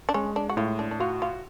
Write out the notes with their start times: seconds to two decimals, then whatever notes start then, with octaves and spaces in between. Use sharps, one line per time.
0.09 D4
0.14 G#3 C#4
0.36 D4
0.49 F#4
0.57 A2 F4
0.79 D4
0.91 D4
1.00 F4 F#4
1.22 F4